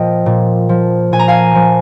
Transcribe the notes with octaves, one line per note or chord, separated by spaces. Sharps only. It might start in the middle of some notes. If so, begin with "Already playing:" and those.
Already playing: A#2 F3 D#5 G5
A#2
F3
A#2 G#5
A#5
F5 G#5
F3